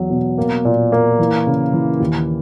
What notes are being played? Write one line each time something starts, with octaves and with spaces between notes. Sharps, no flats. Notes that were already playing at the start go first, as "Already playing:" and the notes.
Already playing: E2 F#3
B2
A#3
A#2
A#3
E3
C#3
E3
D#2